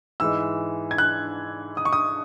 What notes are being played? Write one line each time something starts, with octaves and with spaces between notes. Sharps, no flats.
G#2 E3 G#3 E6
G#6
F#6
D#6
C#6
D#6